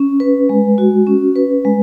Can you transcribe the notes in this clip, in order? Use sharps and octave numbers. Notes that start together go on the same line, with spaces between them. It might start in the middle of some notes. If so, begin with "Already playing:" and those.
Already playing: C#4
B4
G#3
F#4
C#4
B4
G#3